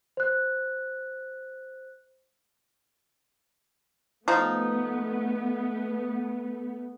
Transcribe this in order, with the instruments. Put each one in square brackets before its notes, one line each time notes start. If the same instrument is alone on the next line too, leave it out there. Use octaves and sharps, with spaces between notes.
[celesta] C5 F#6
[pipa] F3 D#4 [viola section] A3 B3